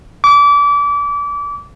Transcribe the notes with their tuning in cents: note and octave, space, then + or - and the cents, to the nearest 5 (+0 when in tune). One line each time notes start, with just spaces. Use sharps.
D6 -30